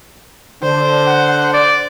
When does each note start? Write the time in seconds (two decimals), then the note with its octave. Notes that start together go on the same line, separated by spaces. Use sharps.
0.63 D3 D4 C5
1.07 F#5
1.54 D5